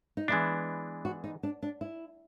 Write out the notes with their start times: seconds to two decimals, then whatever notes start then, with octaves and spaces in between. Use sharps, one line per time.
0.17 D#4
0.28 E3 G#3 B3 D4 E4
1.05 F#4
1.24 D#4
1.43 D4
1.63 D4
1.81 E4